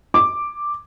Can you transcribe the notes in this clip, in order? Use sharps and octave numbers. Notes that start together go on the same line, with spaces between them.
D6